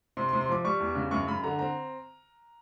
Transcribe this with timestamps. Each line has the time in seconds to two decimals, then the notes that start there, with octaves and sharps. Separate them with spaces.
0.17 C3 C6
0.29 C6
0.33 C3
0.41 C6
0.49 F3 D6
0.64 G3 C#6
0.80 E2
0.95 C#3
1.11 F#2 C#6
1.27 F#2 B5
1.43 D3 A#5
1.59 C4 A#5